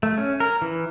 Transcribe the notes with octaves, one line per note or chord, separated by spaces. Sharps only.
A3
C#4
A#4
E3